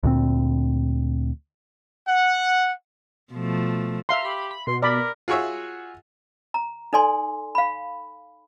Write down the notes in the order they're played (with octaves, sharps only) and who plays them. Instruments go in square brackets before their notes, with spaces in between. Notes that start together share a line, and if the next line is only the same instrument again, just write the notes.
[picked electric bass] D2 A#2 C4
[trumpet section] F#5
[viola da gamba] B2 F3 A3
[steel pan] E5 F5 C6 [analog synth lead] A#5
[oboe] G4 [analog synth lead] B5
[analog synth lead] B5
[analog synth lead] B2 [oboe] C6
[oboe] A#4 [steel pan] D5 B5
[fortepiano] F4 F#4 G#4 C#5 E5
[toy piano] A#5
D#4 A4 D5 G#5 C6
F5 B5